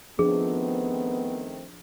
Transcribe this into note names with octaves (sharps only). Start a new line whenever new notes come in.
D#3 F3 A3 B3 C4 D4 G#4